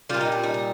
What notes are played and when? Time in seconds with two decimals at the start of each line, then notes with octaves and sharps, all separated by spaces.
0.09 A#2 G3 F4
0.21 D#4
0.32 D4
0.43 D#4
0.54 D#4